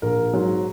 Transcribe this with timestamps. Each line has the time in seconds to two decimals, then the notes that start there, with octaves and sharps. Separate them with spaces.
0.02 A#1 A#4
0.33 G#2 F#3